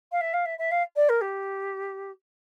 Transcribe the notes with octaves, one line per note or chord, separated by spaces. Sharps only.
F5
E5
F5
E5
E5
F5
D5
A#4
G4